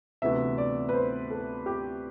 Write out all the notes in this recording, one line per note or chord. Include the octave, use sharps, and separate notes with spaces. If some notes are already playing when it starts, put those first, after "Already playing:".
D2 C3 E3 B3 E5
D5
B4
C5
A4
G4